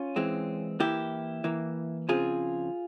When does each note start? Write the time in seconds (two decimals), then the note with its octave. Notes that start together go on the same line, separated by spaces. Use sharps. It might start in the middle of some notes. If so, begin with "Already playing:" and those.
Already playing: C#4 F4
0.16 E3 G#3 C4
0.80 E3 A#3 E4 G4
1.44 E3 A#3
2.09 C#3 F3 C4 F4 G#4